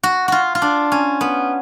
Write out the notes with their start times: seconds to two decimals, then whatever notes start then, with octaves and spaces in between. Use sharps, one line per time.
0.03 F#4
0.28 F4 F#4
0.55 F4
0.62 D4
0.92 C#4
1.21 B3